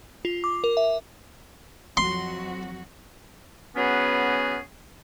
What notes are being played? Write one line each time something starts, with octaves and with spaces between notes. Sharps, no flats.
F4
D6
A#4
E5
F2 F#3 F#4 C6
F#3 B3 C#4 F#4 G#4 B4